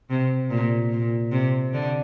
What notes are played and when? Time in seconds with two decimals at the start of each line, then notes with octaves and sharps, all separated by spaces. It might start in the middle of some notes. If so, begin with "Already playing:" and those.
0.10 C3
0.50 A#2
0.92 A#2
1.32 C3
1.73 D3